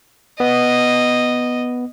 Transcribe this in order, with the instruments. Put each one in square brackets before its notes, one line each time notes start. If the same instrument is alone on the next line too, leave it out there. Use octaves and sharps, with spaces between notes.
[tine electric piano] B3 [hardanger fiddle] D#5